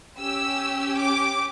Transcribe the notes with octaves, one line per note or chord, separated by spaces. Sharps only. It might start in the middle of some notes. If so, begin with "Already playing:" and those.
C#4 G4 E6
D6